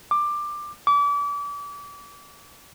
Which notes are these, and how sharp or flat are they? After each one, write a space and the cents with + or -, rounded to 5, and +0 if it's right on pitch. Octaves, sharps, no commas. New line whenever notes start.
D6 +15
D6 -35